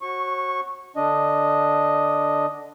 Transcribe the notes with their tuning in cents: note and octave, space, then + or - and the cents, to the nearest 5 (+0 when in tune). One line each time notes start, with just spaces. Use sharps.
F#4 +0 C#5 -40 C#6 -10
D3 +0 D4 +0 D#5 +0